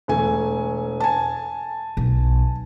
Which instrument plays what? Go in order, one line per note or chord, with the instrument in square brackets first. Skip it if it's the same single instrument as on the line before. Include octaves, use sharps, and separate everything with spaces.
[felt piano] E1 A3 G#5
G#5 A5
[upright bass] B1